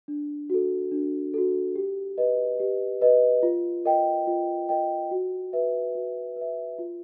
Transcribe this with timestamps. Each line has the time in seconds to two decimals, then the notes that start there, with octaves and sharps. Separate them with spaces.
0.08 D4
0.50 F#4 A4
0.92 D4
1.34 F#4 A4
1.76 G4
2.18 B4 D#5
2.60 G4
3.02 B4 D#5
3.43 F4
3.85 A#4 D#5 G5
4.27 F4
4.69 A#4 D#5 G5
5.11 F#4
5.53 B4 E5
5.95 F#4
6.36 B4 E5
6.79 F4